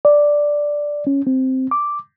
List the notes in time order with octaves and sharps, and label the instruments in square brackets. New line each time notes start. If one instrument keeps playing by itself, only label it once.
[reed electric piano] D5
C#4
C4
D6